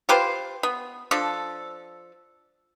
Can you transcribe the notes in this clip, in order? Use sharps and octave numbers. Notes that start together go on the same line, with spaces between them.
F4 G4 B4 C5
B3
F3 D4 A4